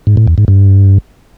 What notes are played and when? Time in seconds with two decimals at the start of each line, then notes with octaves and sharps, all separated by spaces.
0.07 G#2
0.17 A2
0.27 E2
0.38 G#2
0.48 G2